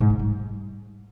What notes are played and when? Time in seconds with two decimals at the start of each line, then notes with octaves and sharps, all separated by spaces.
0.01 G#2
0.10 C#3
0.19 G3